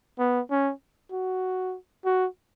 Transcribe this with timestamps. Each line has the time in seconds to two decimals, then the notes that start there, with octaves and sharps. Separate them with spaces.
0.19 B3
0.51 C#4
1.11 F#4
2.05 F#4